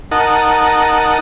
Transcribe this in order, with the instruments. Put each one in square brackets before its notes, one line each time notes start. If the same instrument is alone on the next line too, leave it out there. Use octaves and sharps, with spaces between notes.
[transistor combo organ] D#4 A#4 D#5 F#5 A5